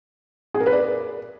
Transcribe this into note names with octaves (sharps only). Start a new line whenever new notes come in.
G#4
A#4
B4
D5